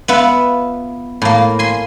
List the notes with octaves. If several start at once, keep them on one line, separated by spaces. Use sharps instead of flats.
B3 F4 B4 E5
A2 A#3
G#5 C6